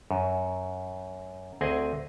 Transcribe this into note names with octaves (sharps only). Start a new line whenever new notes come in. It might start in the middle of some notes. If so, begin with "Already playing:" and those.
F#2
D2 C4 G#4 D#5 G#5